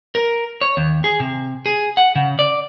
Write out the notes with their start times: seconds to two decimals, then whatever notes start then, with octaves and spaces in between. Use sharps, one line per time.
0.15 A#4
0.61 C#5
0.77 D#2
1.04 G#4
1.20 C3
1.66 G#4
1.97 F#5
2.16 C#3
2.39 D5